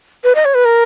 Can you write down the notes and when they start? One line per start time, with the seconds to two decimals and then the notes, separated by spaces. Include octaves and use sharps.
0.24 B4
0.35 D#5
0.45 C#5
0.54 B4
0.65 A#4